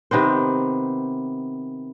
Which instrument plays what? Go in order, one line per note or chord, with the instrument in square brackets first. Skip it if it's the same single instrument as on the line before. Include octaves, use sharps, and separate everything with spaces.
[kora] C3 D#3 B3 C5